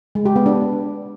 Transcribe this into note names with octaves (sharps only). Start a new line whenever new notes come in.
G#3
G4
B3
D4